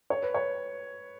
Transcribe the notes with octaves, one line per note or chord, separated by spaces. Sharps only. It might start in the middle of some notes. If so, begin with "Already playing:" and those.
C#5
B4
C#5